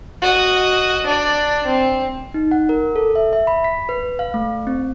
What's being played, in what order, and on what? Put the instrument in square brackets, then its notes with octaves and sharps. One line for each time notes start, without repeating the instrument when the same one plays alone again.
[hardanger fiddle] F#4 D#5
D4 D5
C4
[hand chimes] D#4
F#5
A#4
A4
E5
E5
B5
B6
B4
F5
A3
C4